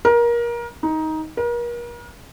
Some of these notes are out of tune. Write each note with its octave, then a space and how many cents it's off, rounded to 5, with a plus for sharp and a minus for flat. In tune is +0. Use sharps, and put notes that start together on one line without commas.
A#4 +25
D#4 +15
A#4 +40